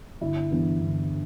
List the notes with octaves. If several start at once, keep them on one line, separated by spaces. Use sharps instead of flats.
G1 E4
G2 E3 B3
G1